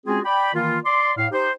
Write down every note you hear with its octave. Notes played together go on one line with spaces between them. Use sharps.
G#3 C4 C#4 F4 F#4 G#4
D5 G5 B5
D#3 E3 A#3 F4
D5 C6
A2 F5
D#4 G4 C5